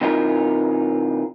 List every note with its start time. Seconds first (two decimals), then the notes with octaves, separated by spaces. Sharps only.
0.01 C3 E3 D#4 F4 A4 A#4